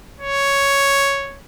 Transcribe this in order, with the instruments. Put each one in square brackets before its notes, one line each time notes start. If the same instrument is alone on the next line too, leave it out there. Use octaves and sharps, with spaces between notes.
[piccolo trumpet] C#5